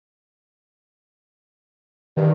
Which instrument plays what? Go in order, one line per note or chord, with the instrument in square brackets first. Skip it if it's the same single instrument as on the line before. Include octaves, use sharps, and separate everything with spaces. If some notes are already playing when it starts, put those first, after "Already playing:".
[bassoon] G2 [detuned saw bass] D#3